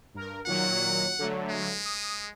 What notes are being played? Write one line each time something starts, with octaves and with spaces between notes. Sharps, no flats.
G2 A#4
A#2 D#3 F#3 F#5
D3 F#3 A3
G#3
D#6